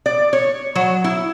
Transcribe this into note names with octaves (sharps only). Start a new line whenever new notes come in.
D5
C#5
F#3
E4